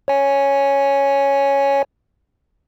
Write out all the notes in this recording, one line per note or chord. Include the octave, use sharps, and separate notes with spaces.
C#5 G#5